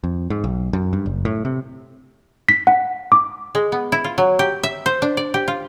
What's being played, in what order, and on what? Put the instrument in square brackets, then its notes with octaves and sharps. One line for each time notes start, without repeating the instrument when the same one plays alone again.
[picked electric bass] F2
G#2
B1
F#2
G2
F#1
A2
C3
[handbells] B6
F#5
D6
[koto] G#3
B3
E4
F4
F#3
G4
E5
C5
D4
D5
G4
F4